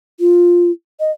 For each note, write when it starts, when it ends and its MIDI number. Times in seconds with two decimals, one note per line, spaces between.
0.20 0.71 65
1.00 1.11 75